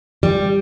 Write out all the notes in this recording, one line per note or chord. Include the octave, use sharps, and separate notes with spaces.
G3